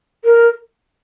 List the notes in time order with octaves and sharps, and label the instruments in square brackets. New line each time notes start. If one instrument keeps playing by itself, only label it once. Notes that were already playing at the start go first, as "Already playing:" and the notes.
[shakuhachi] A#4